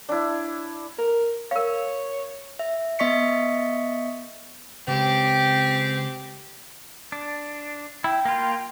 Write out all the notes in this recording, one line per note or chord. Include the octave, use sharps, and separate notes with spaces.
D4 E4
A#4
A#4 C#5 F5
E5
B3 D#5 E5 C#6 B6 C#7
C#3 G#3 C4 G4
D4
E4 G5
A#3 F4